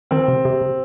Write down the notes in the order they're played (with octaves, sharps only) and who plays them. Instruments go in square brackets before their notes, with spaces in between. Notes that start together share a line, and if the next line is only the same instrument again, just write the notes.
[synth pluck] D#3 [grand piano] C4
[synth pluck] C3
C3
C3